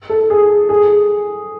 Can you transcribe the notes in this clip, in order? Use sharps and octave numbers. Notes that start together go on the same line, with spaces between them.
A4
G#4
G#4